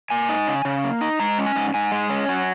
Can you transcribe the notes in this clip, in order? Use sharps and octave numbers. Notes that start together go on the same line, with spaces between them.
A#3 G#5
D#4
C#3
C#3
A#3
D#4
G#3 A#5
C#4
G#5
G#2
G#2 G#5
G#3
C#4
F#3